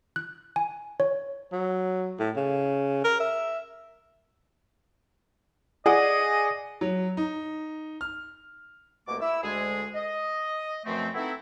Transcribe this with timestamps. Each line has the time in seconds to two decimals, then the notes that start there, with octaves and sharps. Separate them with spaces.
0.16 F#6
0.56 G#5
1.00 C#5
1.52 F#3
2.19 A2
2.36 C#3
3.04 A#4
3.20 E5
5.86 G#4 D5 D#5 F#5
6.81 F#3
7.17 D#4
8.01 F6
9.08 C2 B2 A3 A#3 D6
9.21 E4 E6
9.43 D2 G#3 G#4
9.95 D#5
10.86 F#2 B2 F3 A3 C4
11.14 A3 B3 C4 D#4 E4